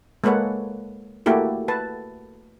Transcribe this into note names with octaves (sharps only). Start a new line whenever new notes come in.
G#3 A#3 A4 B4 C#5 F#5
A3 A#3 E4 F#4 G4 A4
B4 A5